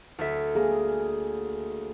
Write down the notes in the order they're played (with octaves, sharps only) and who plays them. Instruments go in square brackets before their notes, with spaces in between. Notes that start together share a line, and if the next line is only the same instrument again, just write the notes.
[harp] D2 A4 E5
[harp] A#3 [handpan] G#4